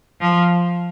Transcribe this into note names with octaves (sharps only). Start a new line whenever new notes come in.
F3